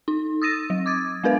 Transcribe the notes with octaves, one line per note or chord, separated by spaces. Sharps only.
D#4
D#6 E6 A6 A#6 D#7
F#3
D6 D#6 G#6 A6
G#3 B3 D4 A#4 B4 F5